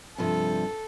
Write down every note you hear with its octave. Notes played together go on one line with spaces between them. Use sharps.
G2 C3 F3 A4